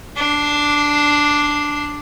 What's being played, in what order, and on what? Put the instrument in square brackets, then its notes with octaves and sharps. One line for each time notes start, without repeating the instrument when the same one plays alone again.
[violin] D4 C7